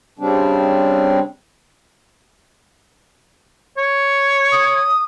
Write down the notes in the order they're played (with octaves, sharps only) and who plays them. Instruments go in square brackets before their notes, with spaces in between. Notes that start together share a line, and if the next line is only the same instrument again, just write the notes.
[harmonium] C#3 G3 C4 D4
[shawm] C#5
[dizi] D#6